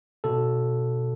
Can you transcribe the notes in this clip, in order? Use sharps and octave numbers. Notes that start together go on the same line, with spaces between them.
B2 A4